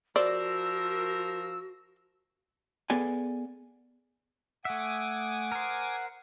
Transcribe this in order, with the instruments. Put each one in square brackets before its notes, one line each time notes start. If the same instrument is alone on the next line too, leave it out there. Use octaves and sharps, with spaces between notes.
[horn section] F3 A#4 [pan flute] F#4 [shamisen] C5 D5 [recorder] E6
[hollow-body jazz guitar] B3 G#4 A4 D5 G#5
[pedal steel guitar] A3 E5 [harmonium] F#5 [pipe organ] G#5 D6 D#6
[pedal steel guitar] A#4 C5